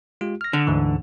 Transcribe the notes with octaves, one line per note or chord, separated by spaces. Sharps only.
G#3 F4 G4
F6 A#6
D3
D2 G#2 E3